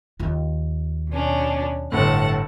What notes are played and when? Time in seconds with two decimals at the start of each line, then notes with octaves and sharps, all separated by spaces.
0.20 D#2 F4
1.11 B2 C#4 D4
1.92 G1 A2 F#5 A5